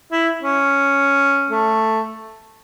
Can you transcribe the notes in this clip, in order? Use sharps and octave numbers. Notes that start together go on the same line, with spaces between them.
E4
C#4
A3